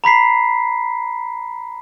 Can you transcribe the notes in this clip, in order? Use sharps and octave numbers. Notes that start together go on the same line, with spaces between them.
A#5 B5 B6 C7